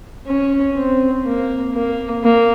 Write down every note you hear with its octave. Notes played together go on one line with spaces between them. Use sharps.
C#4
C4
A#3
A#3
A#3